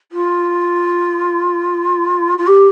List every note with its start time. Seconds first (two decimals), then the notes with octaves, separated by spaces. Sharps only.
0.11 F4
2.37 F4
2.46 G4